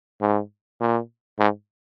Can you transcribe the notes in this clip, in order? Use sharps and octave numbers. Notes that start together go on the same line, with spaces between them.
G#2
A#2
G#2